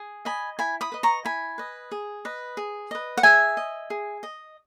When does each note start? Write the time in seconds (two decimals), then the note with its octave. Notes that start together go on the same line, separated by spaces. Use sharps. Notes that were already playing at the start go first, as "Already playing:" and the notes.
Already playing: G#4
0.25 D#5 G#5 B5
0.59 E4 G#5 B5
0.81 B5 D#6
0.92 B4 D#5
1.03 A#5 C#6
1.25 E4 G#5 B5
1.58 B4 D#5
1.92 G#4
2.25 B4 D#5
2.57 G#4
2.91 B4 D#5
3.17 F#5
3.23 G#4 E5 G#5
3.57 D#5
3.90 G#4
4.23 D#5